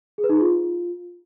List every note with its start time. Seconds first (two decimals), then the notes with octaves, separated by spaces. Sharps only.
0.18 G#4
0.24 B4
0.29 D#4
0.35 G#4
0.41 F4